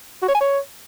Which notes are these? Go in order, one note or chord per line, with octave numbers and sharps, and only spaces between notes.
F#4
C#5
G#5
C#5